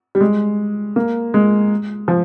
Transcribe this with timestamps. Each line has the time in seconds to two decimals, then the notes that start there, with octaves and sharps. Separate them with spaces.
0.15 G3
0.21 G#3
0.96 A#3
1.34 G#3
2.08 F3